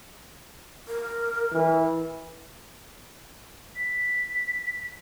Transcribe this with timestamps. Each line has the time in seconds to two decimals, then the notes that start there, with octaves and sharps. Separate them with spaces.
0.88 A#4
1.52 E3
3.75 B6